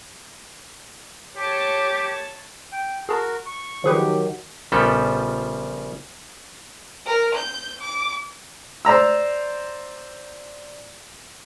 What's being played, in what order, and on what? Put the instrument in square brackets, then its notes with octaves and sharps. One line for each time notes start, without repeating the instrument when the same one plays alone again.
[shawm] G4 [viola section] C#5 A5
[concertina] G5
[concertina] F#4 A#4 [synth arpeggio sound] G#4 A5
[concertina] C#6
[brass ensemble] D#3 F#3 [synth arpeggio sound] F3 G#4 B4 [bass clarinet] G4
[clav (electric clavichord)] A#1 C#3 F3 G3 B3 A4
[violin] A#4
G6
D6
[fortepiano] C5 D5 A#5 E6